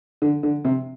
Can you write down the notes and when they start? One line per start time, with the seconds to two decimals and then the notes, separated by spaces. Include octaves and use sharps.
0.22 D3
0.43 D3
0.65 C3